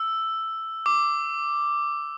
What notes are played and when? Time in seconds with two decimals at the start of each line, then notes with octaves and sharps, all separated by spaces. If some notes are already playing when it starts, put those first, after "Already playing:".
Already playing: E6
0.86 D6